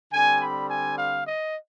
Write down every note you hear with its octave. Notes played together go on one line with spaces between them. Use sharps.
D3 G3 C4 G#5
B5
G#5
F5
D#5